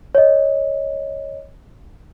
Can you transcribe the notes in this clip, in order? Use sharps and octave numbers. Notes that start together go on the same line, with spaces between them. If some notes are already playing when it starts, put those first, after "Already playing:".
C#5 D#5